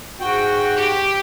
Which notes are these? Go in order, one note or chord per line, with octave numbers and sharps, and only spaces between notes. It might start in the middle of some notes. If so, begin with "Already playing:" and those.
G#2 F#4 G5
G4